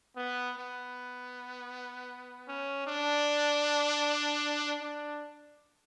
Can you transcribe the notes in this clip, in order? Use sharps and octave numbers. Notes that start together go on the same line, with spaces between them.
B3
B3
C#4
D4
D4